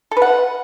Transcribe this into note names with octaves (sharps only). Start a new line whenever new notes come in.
A4
B4
F#5